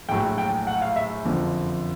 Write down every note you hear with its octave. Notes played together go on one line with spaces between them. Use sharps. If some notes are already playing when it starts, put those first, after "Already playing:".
A#1 A2 F#3 G5
G5
F#5
F5
E5
F#1 F2 D3 F3